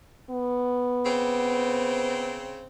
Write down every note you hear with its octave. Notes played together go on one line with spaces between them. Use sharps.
B3
C#3 C4